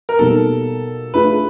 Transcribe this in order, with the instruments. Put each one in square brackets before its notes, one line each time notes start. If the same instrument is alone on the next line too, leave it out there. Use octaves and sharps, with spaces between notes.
[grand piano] A#4
[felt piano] B2 G3 A#3 D#4 [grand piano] A4
[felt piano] A3 D4 F4 G#4 [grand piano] B4